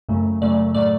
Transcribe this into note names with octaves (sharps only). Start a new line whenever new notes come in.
F#2 C#3 F#3 A3
F#2 C#3 F#3 A3 D5
A2 F#3 A3 D5